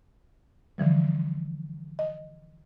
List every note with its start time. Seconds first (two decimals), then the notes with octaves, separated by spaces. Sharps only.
0.78 D3 E3 F3 G3
1.99 D#5